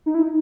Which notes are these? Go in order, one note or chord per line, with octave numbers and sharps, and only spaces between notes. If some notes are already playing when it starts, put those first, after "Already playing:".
D#4
E4
D#4